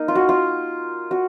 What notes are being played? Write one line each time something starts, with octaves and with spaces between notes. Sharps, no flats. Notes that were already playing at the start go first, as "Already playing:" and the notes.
Already playing: A#3 D#4
F4
F#4
F4
F#4